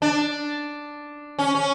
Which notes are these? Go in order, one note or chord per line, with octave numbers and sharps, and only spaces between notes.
D4
C#4
C#4